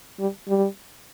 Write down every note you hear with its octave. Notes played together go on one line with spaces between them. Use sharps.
G3
G3